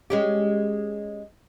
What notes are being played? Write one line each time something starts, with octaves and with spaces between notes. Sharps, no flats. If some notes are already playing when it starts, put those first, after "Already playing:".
G#3 C#4 G4